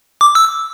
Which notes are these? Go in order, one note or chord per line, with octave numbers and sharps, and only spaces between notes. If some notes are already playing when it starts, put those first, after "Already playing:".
D6
E6